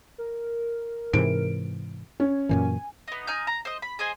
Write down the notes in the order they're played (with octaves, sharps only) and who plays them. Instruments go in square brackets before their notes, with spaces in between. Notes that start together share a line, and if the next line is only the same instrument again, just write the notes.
[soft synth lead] A#4
[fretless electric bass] G#2 C3 E3 [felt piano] D7
[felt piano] C#4 [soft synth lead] C#5
[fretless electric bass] F#2 A#2 E3 [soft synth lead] G#5
[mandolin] B3 D#4
D#4 G#5 F6 G6
A#5
C5 D#5
B5
G#4 C5 D#5 G#5